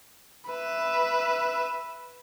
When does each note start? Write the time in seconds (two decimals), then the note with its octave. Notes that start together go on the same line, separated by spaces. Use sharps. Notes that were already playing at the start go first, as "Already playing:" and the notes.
0.50 B4 E5